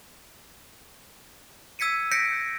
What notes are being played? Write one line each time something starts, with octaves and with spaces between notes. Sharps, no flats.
E6 G#6 B6 C#7 D#7
G6 A#6 B6 C#7 D7